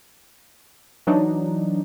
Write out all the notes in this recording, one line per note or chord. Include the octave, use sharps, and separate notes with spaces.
E3 F#3 D4 D#4